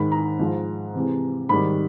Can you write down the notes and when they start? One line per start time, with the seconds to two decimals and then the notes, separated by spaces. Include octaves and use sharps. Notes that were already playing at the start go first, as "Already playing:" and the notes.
Already playing: G#2 D#3 G#3 B5
0.12 A#5
0.39 G#2 F3 G#3
0.95 C3 E3 G#3
1.49 G#2 D#3 G3 B5